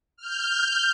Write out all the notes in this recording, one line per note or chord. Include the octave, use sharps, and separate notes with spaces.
F6 G6